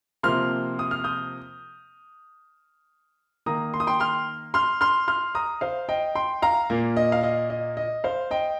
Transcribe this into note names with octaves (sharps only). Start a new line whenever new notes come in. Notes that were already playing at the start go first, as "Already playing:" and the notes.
C3 F3 A#3 C6 F6
D#6
F6
D#6 G6
D#3 A#3 A#5 D#6
C6
D#6
G5 C6
C6 F6
C6 F6
C6 F6
C6 F6
A#5 D#6
C5 F5
D#5 G5
G5 C6
F5 A#5
A#2 A#3
D#5
F5
D#5
D#5
D#5
C5 F5
D#5 G5